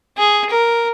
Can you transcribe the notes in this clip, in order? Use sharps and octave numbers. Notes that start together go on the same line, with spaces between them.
G#4
A#4